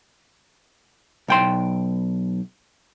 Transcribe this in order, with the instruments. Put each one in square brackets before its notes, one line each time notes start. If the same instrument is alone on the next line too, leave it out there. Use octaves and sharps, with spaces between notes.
[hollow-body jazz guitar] B1 G5 C6